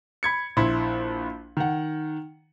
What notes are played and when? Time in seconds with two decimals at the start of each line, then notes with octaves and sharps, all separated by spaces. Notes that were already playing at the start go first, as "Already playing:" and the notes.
0.23 B5 G#6 C#7
0.57 A#1 E4 B5 C6
1.57 D#3 F#5